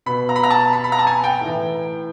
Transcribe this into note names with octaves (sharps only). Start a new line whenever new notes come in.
B2 B5
A#5
B5
A#5
A5
B5
B5
A#5
A5
G#5
G5
A2 E3